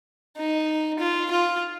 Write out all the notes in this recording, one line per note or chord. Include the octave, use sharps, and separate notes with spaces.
D#4
F4
F4